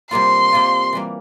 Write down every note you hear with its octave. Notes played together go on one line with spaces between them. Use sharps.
C3 G3 A#3 F4 C6
C3 G3 A#3 F4
E3 G3 A#3